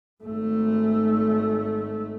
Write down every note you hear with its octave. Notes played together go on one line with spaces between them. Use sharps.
G#1 A3